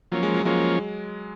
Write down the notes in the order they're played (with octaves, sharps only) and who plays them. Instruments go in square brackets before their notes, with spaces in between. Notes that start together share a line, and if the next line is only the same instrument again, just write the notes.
[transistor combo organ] F3 A#3 C#4 [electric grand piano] F#3
[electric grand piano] G#3
F#3
[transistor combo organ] F3 A#3 C#4 [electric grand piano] G#3